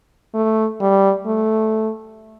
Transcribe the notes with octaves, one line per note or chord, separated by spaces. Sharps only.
A3
G3
A3